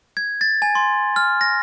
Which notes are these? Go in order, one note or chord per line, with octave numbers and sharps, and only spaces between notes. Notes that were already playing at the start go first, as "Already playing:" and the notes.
G#6
A6
G#5
C6
F6
A#6